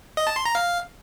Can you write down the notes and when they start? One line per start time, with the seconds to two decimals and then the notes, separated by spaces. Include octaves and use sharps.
0.17 D#5
0.27 A5
0.36 C6
0.45 A#5
0.55 F5